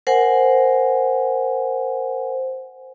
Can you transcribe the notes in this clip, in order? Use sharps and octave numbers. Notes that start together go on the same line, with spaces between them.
A#4 C5 F#5 G#5